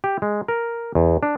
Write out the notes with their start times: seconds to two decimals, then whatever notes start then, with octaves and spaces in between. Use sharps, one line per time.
0.04 G4
0.22 G#3
0.48 A#4
0.95 E2
1.23 D4